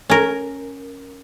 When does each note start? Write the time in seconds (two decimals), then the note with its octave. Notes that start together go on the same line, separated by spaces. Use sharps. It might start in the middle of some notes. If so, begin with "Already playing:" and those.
0.10 C#4 A#4